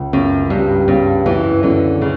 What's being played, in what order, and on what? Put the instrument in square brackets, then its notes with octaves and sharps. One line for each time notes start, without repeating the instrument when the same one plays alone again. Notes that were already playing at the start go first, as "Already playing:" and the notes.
Already playing: [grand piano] C#2
[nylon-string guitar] F#2 [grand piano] C#3
[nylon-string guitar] G2 [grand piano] G3
[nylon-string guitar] G2 [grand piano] C#3
[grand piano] F#2 [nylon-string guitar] E3
[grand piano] F#2 [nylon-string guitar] D3
[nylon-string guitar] C#3